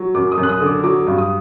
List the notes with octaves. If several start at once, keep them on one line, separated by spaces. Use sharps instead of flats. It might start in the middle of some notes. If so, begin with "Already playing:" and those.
Already playing: F#3
F#2 D6
D#6
F#2
F#6
D#6
D3
D6
F#3 D6
G2
D#6